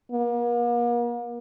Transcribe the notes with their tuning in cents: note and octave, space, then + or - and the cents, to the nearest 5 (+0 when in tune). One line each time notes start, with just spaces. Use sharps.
A#3 +40